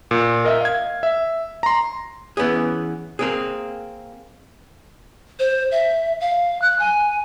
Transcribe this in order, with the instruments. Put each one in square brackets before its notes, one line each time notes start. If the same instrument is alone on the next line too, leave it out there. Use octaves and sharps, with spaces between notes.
[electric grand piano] A#2
A#4 D#5 E5
F5 G#6
E5
A#5 C6
[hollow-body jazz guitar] E3 B3 C#4 G#4
A#3 C4 G#4
[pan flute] C5
E5
F5
F#6
G#5